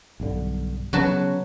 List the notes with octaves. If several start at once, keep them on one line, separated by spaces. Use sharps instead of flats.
B1 G2 D3
C#3 F#3 B3 F#4 A5